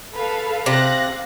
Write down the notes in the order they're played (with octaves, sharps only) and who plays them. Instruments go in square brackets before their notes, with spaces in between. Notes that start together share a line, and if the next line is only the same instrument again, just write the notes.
[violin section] A4 F5 [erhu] B4
[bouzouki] C3 [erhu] F5 [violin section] F#6 A#6